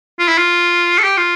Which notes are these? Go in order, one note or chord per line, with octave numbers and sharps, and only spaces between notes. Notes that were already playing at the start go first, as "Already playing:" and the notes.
F4
E4
F4
A4
G4
F4